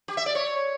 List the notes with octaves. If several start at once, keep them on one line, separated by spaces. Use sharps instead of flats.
G4
E5
D5
C#5